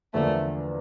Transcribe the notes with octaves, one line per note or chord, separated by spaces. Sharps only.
E2 D3 F3 A3 A#3 D4